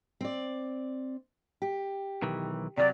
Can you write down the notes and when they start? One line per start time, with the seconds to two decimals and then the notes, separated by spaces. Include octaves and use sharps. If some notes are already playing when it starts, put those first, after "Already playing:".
0.21 C4 D5
1.62 G4
2.22 B1 D#3 E3
2.77 C3 D#3 F#3 D5